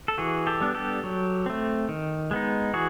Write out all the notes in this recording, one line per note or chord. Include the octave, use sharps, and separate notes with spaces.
A4
E3 F#4 G#4
G4 A4
G3 B3 D4
G4 A4
F#3
A3 C4
D#3
G#3 B3 D#4
E3 F#4 G#4